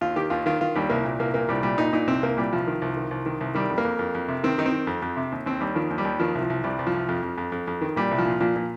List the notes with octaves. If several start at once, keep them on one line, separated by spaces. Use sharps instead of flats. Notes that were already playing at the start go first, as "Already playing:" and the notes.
D#2 F4
D#3 G4
D#2 F4
D#3 F4
D#3 F4
D#2 G3
C2 A#3
A#2
C2 A#3
A#2 A#3
C2 G3
A#2 G3
A#2 D#4
A#2 D#4
C2 C4
C2 A#3
A#2 G3
C2 F3
D#3
C2
D#3
C2
D#3
C2
D#3 G3
F2
A#3
F2
F2
F2
C3
D#3 C4
D#3 D#4
C4
D#3
F2
F2
C3
D#2
D#2 C4
D#2 G3
D#3 F3
D#2
G3
D#2
D#3 F3
C2
F3
C2
C2 G3
C2
F3
C2
F2
F2
F2
F2
F2
D#3
A#2 G3
C2
F3
A#2
A#2 F3
A#2